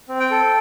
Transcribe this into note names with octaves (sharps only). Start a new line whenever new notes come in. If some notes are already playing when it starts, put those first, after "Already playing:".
C4
G5
A4